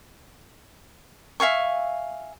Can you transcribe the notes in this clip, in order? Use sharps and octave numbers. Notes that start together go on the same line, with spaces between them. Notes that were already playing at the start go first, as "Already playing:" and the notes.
E5 F5 G#5 C#6